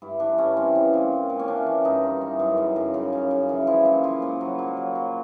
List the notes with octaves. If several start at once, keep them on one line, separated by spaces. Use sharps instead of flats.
G2 E4
E3 D4
G2 C#4
E3 C4
F3
A#2
A#2
A#2
C#4
E3 D4
E3
G2 D#4
G2
E3
F#2
C#3
F#2
C#3
C#3
C#3
E3
F3 E4
A#2
F3
A#2
F#3
A#2
F#3
F#3